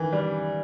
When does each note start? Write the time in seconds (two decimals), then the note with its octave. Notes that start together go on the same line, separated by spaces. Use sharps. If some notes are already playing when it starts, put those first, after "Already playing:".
Already playing: D#3 E3
0.13 G3